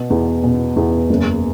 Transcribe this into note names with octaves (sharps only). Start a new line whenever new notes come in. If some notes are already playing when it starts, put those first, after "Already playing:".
Already playing: B2
E2
B2
E2
F#1